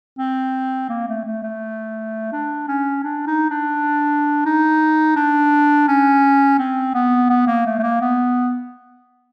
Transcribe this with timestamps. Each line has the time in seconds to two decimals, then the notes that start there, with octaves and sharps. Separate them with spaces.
0.18 C4
0.89 A#3
1.08 A3
1.25 A3
1.42 A3
2.32 D4
2.68 C#4
3.03 D4
3.27 D#4
3.50 D4
4.46 D#4
5.16 D4
5.87 C#4
6.59 C4
6.94 B3
7.30 B3
7.47 A#3
7.66 A3
7.79 A3
7.83 A#3
8.01 B3